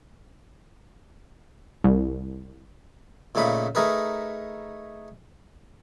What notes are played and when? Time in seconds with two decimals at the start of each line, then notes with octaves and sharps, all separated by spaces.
1.84 C2
3.35 A#2 C#3 A3 D#4 B5
3.75 A3 D#4 G#4 A#4 B4